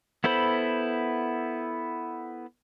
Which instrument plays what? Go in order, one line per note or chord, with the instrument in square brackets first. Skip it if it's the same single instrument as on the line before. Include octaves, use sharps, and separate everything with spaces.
[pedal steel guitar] B3 E4 A4 C5 B5